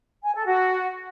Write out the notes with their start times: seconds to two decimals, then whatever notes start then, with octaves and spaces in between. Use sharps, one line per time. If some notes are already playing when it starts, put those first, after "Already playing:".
0.23 G#5
0.34 A4
0.46 F#4